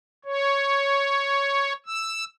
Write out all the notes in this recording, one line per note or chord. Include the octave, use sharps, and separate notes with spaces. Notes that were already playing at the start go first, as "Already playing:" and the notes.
C#5
E6